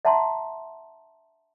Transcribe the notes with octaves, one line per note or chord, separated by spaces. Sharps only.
E5 F#5 A5 A#5 C6